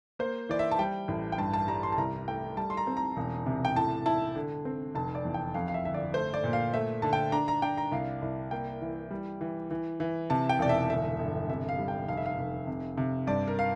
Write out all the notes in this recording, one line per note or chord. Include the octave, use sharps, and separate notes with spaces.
A#3 C5
E3 D5
E5
A5
G3 G5
A1
G5
G2 A5
A5
G3 A#5
C6
A5
C2 A#5
A3 G5
G3 A5
C6
A#5
C4
A#5
E1
C3
G5
A2 A5
E4 A5
D3
C4
F1 A5
D5
E2
G5
F2 F5
F5
E5
G1 E5
D5
A3 C5
D5
A#2
F5
A3 E5
D3 A5
G5
D4 A#5
A#5
D4 G5
A#5
C2 F5
C2
A#3 G5
E3
G3
E3
E3
E3
C3 A5
G5
E1 D5
E5
G1 E5
G1
C3 E5
F5
G3
G5
F1 F5
E5
F5
F1
C3
C3
G2 D5
A#4
F5